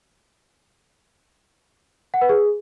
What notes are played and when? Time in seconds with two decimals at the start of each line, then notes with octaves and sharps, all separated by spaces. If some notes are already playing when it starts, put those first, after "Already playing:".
2.14 F#5
2.21 B4
2.29 G#4